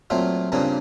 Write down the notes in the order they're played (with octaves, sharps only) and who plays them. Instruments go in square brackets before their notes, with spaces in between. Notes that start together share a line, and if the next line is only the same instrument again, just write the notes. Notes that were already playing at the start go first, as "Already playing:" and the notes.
[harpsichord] A#2 F#3 A3 C4 F4
G2 A#2 C#3 A#3 C4 D4